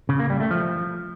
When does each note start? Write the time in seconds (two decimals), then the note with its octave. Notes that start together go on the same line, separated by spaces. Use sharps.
0.09 C#3
0.19 A#3
0.30 G3
0.40 A3
0.51 F3